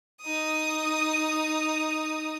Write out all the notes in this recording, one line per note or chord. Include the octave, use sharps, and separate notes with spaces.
D#4 D#6